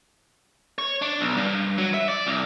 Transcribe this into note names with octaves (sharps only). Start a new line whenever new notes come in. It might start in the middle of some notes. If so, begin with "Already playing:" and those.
C#5
D4
B1
G2
F#3
E5
D5
C2